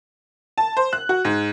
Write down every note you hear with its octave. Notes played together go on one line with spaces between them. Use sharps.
A5
C5
F#6
F#4
G#2